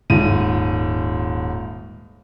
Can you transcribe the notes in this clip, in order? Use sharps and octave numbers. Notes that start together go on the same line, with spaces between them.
D#1 G#2 D#7